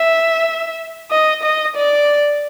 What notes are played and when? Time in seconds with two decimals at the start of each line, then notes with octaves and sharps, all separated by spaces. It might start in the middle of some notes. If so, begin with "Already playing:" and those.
Already playing: E5
1.11 D#5
1.43 D#5
1.75 D5